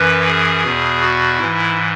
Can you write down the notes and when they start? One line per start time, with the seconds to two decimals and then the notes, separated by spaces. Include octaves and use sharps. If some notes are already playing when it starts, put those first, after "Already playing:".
Already playing: F#2 E3 B4
0.26 G#4
0.64 E2 B2
1.01 F#4
1.38 G#2 E3 E4